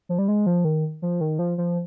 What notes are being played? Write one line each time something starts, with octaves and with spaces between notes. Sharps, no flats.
F3
G3
G#3
F3
D#3
F3
D#3
F3
F3